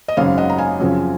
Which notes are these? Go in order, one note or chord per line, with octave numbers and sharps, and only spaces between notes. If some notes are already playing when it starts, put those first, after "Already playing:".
D#5
G#1 F#2 C#3 F#3 C#5 F5
D#5 F#5
A#5
F5 G#5
F#2 C#3 F3 C4